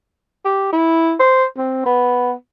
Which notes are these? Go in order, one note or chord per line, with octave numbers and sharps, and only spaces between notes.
G4
E4
C5
C4
B3